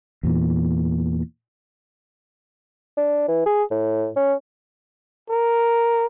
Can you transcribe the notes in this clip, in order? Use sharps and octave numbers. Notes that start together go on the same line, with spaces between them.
E2 A#2 E3
D4
E3
G#4
A2
C#4
A#4